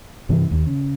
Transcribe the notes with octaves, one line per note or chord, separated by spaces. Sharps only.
G2 C3 E3 C4
D#2
C#3